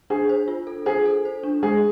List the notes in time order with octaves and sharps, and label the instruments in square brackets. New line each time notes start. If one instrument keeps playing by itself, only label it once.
[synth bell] D4 [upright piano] G#4
[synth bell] C5
F4
A4
[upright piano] G#4 [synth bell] C5
[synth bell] A4
C5
D4
[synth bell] G#3 [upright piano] G#4